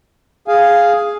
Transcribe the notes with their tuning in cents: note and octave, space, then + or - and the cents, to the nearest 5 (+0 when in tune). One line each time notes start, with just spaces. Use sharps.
G#4 +0 F5 +0 G#5 +0